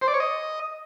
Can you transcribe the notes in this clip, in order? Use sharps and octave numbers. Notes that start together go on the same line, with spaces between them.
C5
D5
C#5
D#5